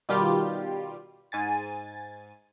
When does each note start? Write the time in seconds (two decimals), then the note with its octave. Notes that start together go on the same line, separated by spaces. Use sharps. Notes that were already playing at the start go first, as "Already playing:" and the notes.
0.09 B2 D#3 G3 F4 G4
1.32 G#2 G#5 A6